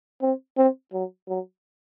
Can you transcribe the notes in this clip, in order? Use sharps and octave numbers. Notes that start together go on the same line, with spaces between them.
C4
C4
F#3
F#3